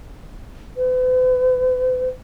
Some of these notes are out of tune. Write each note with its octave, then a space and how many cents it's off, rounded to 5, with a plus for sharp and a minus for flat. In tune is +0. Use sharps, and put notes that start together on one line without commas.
B4 +45